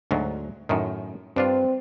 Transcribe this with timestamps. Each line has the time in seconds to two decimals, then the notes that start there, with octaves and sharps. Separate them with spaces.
0.11 D2 G#2 F#3
0.69 F#2 A2 D#3
1.36 G2 C4 D4 F4